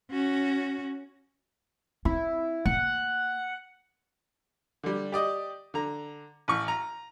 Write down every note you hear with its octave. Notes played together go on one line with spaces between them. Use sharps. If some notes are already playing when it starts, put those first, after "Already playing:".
C#4 F#4
C4 E4
A#3 F#5
D3 G3
G4 D5 D#5
D3 A#5
A1 C#6
A#5